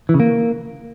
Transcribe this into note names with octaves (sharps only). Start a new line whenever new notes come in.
E3
C#3
A#3